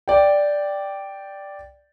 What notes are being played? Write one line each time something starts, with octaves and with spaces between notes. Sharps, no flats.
D5 G5